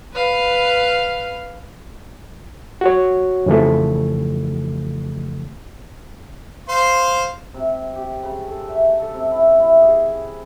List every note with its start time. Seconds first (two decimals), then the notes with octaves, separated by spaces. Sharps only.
0.13 B4 F5
2.81 F#4 C#5
3.46 F2 C#3 E3 F3 A3
6.69 C5 F5 C6
7.54 C3
7.95 G4
8.23 C#3
8.47 A4
8.68 E5
8.99 A4
9.14 C3
9.32 E4
9.60 E4
9.82 G#4